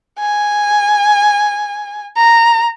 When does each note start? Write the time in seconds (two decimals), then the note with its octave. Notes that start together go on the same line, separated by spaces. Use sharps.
0.19 G#5
2.17 A#5